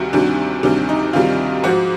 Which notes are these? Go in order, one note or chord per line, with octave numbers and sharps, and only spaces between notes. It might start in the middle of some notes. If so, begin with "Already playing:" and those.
Already playing: D2 C3 D#3 G3 F#4
D2 C3 D#3 G3 D4
D2 C3 D#3 G3 D4
D#4
D2 C3 D#3 G3 F4
G#2 F3 F#4